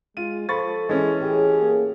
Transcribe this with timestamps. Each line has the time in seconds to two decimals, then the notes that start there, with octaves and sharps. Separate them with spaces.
0.17 G#3 F4 D#7
0.49 F3 A4 B5 C#6 A6
0.89 E3 G#3 C#4
1.21 A2 G4 G#4
1.59 A#3